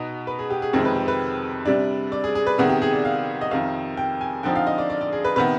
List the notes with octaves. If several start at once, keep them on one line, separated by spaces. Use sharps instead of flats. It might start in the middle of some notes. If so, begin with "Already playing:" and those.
Already playing: B2 B3 D#4 D#5
B4
G#4
G4
G#4
F2 C3 D#3 G#3 C4 G#4
B4
G4
B4
C3 G3 D4
D5
G#4
G#4
B4
C3 D#3 B3 G#4
G4
G#4
D5
F5
D#5
F2 C3 D#3 F5
G5
G#5
D3 F3 C4 D#4 G5
F5
D#5
D5
D5
D5
G#4
B4
C3 D#3 B3 B4